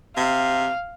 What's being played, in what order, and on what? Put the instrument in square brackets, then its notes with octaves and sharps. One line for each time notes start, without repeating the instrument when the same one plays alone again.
[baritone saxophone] C3 [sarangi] F5